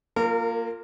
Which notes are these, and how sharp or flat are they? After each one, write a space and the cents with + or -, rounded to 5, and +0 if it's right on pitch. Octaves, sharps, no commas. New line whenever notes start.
A#3 +0 F4 +0 A#4 -35